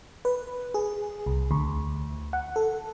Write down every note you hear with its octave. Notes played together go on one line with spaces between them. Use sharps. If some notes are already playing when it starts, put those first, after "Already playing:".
B4
G#4
C2
D2
F#5
A4